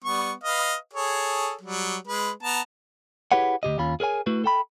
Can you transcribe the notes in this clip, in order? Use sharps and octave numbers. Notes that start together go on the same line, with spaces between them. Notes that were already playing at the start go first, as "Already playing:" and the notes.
G3 B3 C#6
B4 D#5 F5
G#4 A4 C#5
F#3 G3
G#3 B4
B3 A5 A#5
E4 G4 G#4 B4 C#5 F#5
D2 B2 G4 D#5
D#2 C#4 F4 B5
G#4 A#4 C#5 G#5
A3 E4 F#4 B4
A4 G5 B5